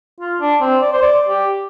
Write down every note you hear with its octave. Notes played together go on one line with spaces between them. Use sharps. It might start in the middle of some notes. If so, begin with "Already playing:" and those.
F4
D4
C4
D5
C5
D5
G4